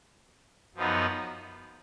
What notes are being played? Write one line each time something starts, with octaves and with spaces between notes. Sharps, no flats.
F#2 F3 B3 D#4